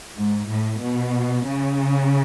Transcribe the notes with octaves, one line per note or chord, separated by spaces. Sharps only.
G#2
A2
B2
C#3